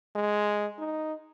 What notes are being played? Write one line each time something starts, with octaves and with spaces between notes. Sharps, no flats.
G#3
D#4